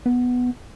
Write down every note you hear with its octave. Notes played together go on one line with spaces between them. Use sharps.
B3